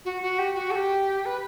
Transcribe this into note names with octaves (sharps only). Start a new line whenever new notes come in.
F#4
F#4
G4
F#4
A4
G4
B4